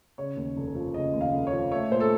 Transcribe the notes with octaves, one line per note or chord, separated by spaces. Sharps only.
C#3 C#5
D#2
F1
F3
C#3 D#5
D#2
F5
F1
C#5
F3
A3 C#5
A#2 C5
A4